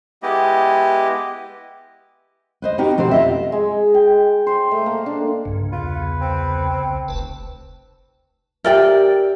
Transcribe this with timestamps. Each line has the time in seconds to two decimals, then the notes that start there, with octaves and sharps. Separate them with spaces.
0.23 G#3 B3 E4 G4 D#5
2.62 B4 C5 D#5
2.78 B3 D#4 F#4 G4 A#4 C5
2.97 B2 C4 F#4 G4 C5
3.11 F4 D#5 E5
3.52 G#3
3.94 G5
4.47 C5
4.71 A3
4.86 A#3
5.06 D4
5.45 C2 G2 C#3
5.72 E2 F4 B4
6.21 C4
7.08 F1 C#2 B4 A5
8.64 G4 A#4 D5 E5 G5